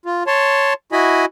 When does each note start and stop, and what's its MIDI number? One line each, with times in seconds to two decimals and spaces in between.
0.06 0.23 65
0.27 0.73 73
0.27 0.73 81
0.27 0.73 84
0.92 1.25 64
0.92 1.25 66
0.92 1.25 75
0.92 1.25 80
0.92 1.25 83